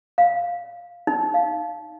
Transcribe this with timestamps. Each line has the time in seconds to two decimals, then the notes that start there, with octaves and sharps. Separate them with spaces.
0.18 F5
1.07 D#4
1.34 F5